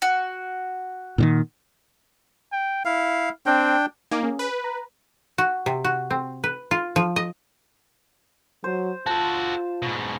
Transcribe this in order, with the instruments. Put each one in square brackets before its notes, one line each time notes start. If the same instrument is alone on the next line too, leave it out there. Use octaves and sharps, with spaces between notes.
[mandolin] F#4
[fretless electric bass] A#2 D3 D#3
[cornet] G5
[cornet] E4 [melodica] F5
[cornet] C4 [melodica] D4 G5
[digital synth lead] A#3 [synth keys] D#4 G#5 D6
[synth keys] C#4 G#4
[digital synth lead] B4
[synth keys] A#5
[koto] F#4
C3
F#4
C4
B4
F4
F3
D#5
[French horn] F#3 [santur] C5
[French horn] F4 [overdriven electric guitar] F#4 A4 [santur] A5
[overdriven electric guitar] G#2 B2